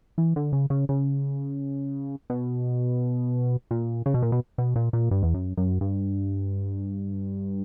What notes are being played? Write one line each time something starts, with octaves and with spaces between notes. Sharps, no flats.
E3
D3
C#3
C#3
C#3
B2
A#2
C#3
B2
A#2
B2
B2
A#2
A#2
G2
E2
F#2
F#2
G2